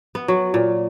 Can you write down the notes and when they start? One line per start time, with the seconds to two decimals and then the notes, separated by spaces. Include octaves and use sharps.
0.15 B3
0.28 F#3
0.54 A#2